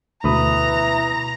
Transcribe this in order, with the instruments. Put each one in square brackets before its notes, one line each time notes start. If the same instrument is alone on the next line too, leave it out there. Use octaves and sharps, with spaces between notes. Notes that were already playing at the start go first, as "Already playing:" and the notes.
[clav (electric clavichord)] D2 [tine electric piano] B2 B5 D#6 [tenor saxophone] E3 [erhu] A#5